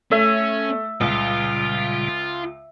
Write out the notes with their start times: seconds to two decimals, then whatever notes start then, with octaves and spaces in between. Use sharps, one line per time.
0.12 A3 C#4 E5
1.01 C#2 A#2 C#3 G3 F4